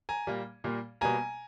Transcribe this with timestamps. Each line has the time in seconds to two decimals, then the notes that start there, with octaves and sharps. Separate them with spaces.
0.09 G#5 A#5
0.27 A#2 G3 A#3
0.64 A#2 G3 A#3
1.01 B2 G3 A#3 G#5 A#5